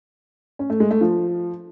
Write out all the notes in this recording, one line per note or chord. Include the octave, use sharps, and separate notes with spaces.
C#4
A3
G#3
A3
F3